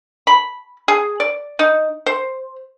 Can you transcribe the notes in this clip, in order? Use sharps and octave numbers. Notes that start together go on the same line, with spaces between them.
B5
G#4
D5
D#4
C5